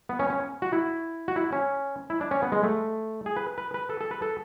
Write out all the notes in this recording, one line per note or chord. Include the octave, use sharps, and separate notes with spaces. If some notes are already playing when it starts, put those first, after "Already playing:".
B3
C#4
C#4
F#4
E4
F#4
E4
C#4
E4
D4
C#4
B3
G#3
A3
G#4
B4
B4
B4
A4
A4
B4
A4